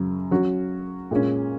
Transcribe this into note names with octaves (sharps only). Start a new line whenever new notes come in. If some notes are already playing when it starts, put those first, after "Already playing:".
Already playing: F#2 C#3 F#3
F#3 C#4 F#4
A#2 G#3 C#4